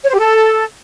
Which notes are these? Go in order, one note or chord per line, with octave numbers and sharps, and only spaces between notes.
C#5
C5
G4
A4